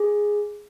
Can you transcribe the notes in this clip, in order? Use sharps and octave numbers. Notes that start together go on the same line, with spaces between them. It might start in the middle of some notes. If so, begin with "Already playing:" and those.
Already playing: G#4